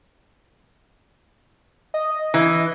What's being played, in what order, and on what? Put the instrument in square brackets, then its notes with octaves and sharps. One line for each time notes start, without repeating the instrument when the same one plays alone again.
[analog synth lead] D#5
[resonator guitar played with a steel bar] E3